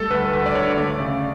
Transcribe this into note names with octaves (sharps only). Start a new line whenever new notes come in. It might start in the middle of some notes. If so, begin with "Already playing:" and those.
Already playing: G3 A3 A4
D2 B4
D2 B4
D5
D3 C#5
A3 D5
C#3